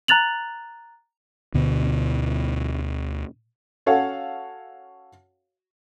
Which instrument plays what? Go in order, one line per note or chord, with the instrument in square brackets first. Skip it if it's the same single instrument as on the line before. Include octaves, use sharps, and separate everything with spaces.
[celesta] A#5 F#6 A6 F7 F#7
[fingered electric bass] D2 B2 D3
[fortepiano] C#4 F#4 A4 C#5 F5 F#5